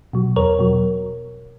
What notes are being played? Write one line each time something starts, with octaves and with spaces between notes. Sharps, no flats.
B2 F#3
E2 A#4 C#5
B2 F#3